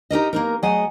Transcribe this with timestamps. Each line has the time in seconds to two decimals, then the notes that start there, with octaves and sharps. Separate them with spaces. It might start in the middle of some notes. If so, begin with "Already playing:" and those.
0.10 D#4 G4 A#4 D#5
0.33 A#3 D#4 A#4
0.63 F#3 A3 G#4 D#5 F#5 G#5